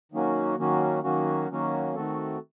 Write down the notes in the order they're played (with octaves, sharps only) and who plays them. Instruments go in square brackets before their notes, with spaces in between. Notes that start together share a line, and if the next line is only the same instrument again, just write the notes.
[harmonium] D#3 F#3 A#3 C#4 F#4
D#3 F#3 A#3 C#4 F#4
D#3 F#3 A#3 C#4 F#4
D#3 F#3 A#3 C#4 F#4
D#3 A3 C4 F#4 A4